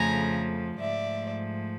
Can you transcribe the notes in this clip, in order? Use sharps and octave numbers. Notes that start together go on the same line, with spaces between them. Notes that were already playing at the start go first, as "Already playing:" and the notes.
Already playing: F2 C#3 F3 A3 G#5 A#5
G#2 F3 A3 D5 E5